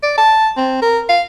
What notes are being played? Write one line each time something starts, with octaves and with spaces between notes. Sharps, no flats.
D5
A5
C4
A#4
F5